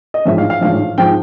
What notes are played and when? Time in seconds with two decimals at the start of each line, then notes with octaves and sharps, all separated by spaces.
0.14 D#5
0.25 A1 G#2 F3 E5
0.38 F5
0.50 F5
0.61 A1 G#2 F3 F5
0.98 G#2 F3 G5